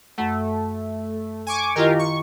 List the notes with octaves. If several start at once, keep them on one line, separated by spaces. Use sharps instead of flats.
F#2 A3 F#5
G#5 C#6 D6
D#3 E4 F4 G4 A#4 D#5
C#6